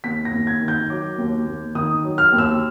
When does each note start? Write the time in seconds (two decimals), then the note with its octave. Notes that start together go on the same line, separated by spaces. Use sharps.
0.04 D#2 B6
0.25 A#6
0.33 D#2
0.47 G#6
0.61 D#3
0.68 G6
0.90 F#3 D6
1.18 D#2
1.46 D#2
1.75 D#3 D#6
2.03 F#3
2.18 F6
2.32 D#2
2.38 E6